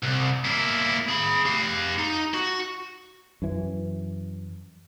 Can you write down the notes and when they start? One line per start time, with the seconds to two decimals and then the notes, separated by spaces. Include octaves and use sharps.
0.03 C2
0.45 A#3 E4
1.08 G#4 B5
1.46 G4 F5
1.99 D#4
2.34 F#4
3.42 F#2 E3